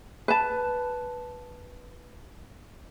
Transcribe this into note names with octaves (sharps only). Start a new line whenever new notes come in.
B4 A5